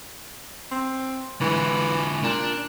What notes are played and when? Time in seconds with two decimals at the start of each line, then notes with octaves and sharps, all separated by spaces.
0.71 C4
1.41 D3 E3 G#3
2.24 A#2 D4